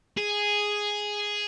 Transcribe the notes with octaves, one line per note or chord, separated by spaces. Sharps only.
G#4